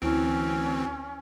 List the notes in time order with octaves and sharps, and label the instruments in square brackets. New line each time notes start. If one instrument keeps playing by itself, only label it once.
[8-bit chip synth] D2 E3 C4 [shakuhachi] C#4 [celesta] E4 D7